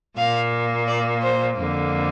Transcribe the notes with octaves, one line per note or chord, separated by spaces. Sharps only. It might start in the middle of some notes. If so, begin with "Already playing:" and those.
A#2 A#3 F5
D5
C5
F2 D3 A#3